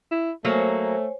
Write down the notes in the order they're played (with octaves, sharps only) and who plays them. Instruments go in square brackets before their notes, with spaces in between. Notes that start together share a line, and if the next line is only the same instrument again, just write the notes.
[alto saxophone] E4
[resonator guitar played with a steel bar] F#3 A#3 [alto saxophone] A3 [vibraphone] C5 C#5 G#5